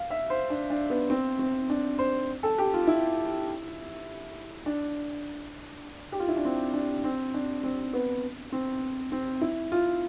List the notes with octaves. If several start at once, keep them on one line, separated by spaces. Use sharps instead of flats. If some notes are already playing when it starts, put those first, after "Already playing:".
Already playing: F5
E5
C5
D4
D4
B3
C4
C4
D4
C5
A4
G4
F4
E4
D4
G4
F4
E4
D4
C4
D4
C4
D4
C4
B3
C4
C4
E4
F4